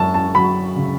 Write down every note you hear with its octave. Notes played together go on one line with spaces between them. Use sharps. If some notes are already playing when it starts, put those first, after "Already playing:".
Already playing: F#2 A5
A5
F#3 B5
C#3